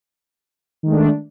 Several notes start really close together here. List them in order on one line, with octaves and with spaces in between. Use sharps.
D#3 G#3 A3 D4